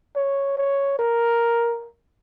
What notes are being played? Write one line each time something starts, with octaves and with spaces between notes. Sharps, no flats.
C#5
C#5
A#4